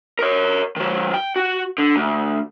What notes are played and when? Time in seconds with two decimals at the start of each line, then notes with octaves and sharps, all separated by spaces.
0.19 A#4 C#5
0.76 D#3 F#3
1.14 G5
1.36 F#4
1.78 D3
1.96 D2